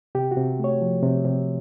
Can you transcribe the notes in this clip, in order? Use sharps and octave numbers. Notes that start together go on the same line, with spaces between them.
C3 G4
F#4
C3
A3 C#5
F3
C3
C3